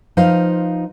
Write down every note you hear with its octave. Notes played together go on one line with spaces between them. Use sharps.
F3 D#4 B4 C5 F5